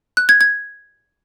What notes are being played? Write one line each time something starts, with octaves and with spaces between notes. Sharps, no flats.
F#6
G#6
G#6